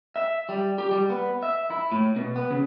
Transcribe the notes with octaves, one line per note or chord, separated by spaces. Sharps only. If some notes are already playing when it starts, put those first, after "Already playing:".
E5
G3
G4
G3
B3
E5
E4
A2
B2
B3
C#3